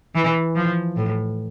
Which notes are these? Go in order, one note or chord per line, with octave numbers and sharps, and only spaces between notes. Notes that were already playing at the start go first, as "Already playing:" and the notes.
E3
F3
A2